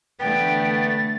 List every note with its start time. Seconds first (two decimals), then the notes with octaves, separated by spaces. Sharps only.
0.20 D3 E3 A3 B3 G5 A6